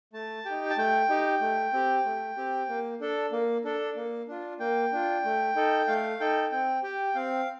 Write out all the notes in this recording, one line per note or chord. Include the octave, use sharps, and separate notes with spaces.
A3 A5
D#4 G4 G5
A5
A3 G5
D#4 G4
A3
C4 G4
A3
C4 G4
A#3
D4 A4
A#3
D4 A4
A#3
D4 F4
A#3 G5
D4 F4
A3
D#4 A4
A3 F5
D#4 A4 G5
C4 G5
G4 G5
C4 F5